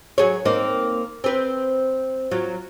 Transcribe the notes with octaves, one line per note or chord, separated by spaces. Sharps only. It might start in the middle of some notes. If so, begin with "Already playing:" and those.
F#3 G#4 C#5
A#3 C4 D#4
C4 B4
F#3 F4